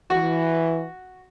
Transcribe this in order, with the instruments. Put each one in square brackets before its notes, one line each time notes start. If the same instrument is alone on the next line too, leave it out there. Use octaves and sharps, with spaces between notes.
[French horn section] E3 [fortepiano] F#4